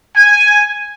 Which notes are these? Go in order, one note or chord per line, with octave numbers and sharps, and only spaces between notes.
G#5